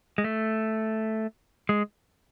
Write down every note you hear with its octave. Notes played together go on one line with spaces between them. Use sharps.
G#3
A3
G#3